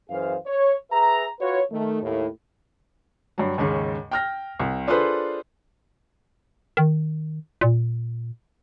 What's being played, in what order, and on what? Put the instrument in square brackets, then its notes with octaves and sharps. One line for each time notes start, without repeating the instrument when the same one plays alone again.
[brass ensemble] F#2 E3 G#4 C5 F5
C#5
G#4 B4 E5 A#5
F4 F#4 B4 C#5
D#3 A3
D#2 A2
[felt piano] G2 F#3
D#2 G#2 C#3 C#4
G5 F6 A#6
C2
D4 F4 G#4 A4 B4 C5
[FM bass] D#3
A#2